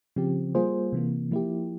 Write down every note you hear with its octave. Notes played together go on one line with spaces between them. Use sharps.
C#3 F3 C4 G4
G3 A#3 F4 G#4 C5
C3 E3 A#3
F3 A#3 E4 G4